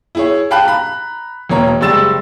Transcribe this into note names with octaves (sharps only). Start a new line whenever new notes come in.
E4 G#4 C#5
F5 G5 A5 B5 F#6
A#5 B5
E1 A#3 C#5 A#5
F#1 G3 G#3 E6 A6 E7